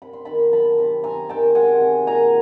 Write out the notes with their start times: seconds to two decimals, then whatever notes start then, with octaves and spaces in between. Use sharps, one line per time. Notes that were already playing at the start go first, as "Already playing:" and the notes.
0.02 C3 B5
0.13 C6
0.25 D#3 A5 B5
0.52 F#3 A5 B5
0.79 C3
1.04 C3 G#5 A#5
1.29 D#3 G5 A5
1.55 G#3 F#5 G#5
1.81 C3
2.07 A#2 G#5 A#5